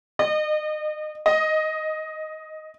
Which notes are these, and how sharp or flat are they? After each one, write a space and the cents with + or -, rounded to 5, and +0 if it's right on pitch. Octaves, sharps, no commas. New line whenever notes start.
D#5 -35
D#5 +5